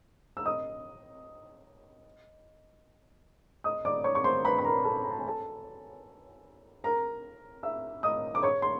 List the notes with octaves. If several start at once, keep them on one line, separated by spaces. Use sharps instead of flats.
E6
D#5 D#6
D#5 D#6
D5 D6
C#5 C#6
C#6
C5 C6
B4 B5
B5
A#4 A#5
A4 A5
A#5
A5
G#5
A4 A5
A#4 A#5
E5 E6
D#5 D#6
D6
C#5 C#6
C6